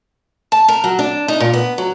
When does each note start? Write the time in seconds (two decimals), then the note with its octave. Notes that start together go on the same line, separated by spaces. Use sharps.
0.52 A5
0.68 A#4
0.84 F#3
0.99 D4
1.28 D#4
1.40 A#2
1.53 B3
1.78 F#3